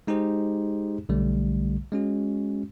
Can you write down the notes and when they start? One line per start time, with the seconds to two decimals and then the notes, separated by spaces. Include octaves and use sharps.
0.07 G#3 D#4 G4 G#4 C5
1.09 B1 D3 G3 A3
1.92 G#3 C#4 F#4